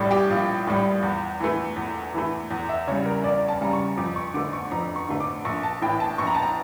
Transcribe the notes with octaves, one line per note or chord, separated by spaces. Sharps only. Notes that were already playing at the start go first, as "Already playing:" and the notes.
Already playing: A#1 A2 G3 D5
G4
A#1 F4
A2 G3
E2
E3 A3
E2
E3 A3
E2
E5
C#3 G3 C#5
A#4
E2 D5
A5
C#3 G3 A#5
C#6
F2 D6
C#6
D3 A3 D6
C#6
F2 A#5
C#6
D3 A3
D6
A#1 C#6
A5
A2 E3 G5
A5
A#1 C#6
A#5
A5
A#5